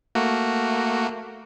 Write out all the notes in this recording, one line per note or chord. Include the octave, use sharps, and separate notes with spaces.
A3 A#3 F#4